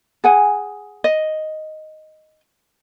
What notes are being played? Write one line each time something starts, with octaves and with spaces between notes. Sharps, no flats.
G#4 F#5 G#5
D#5